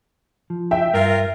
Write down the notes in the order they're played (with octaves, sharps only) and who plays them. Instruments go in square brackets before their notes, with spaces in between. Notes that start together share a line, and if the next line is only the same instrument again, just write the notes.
[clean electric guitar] F3
[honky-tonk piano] E5 G5
[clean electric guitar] G2 [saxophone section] F4 A#4